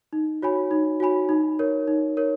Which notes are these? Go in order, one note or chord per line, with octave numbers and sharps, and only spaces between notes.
D#4
F#4 C#5 G#5 B5
D#4
F#4 C#5 G#5 B5
D#4
A#4 C#5
D#4
A#4 C#5